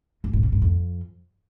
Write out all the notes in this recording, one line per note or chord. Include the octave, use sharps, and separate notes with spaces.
G2
A2
C#3
G2
F2